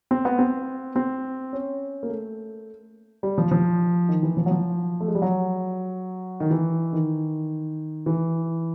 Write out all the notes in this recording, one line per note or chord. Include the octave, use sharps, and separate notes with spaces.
C4
B3
C4
C4
C#4
A#3
A3
G3
F3
F3
D#3
E3
F3
F#3
F3
A3
G#3
G3
F#3
D#3
E3
D#3
E3